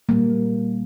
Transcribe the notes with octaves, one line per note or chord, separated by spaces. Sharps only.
A#2 G3 A#3